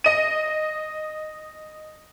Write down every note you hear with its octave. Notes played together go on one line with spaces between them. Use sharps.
D#5 D#7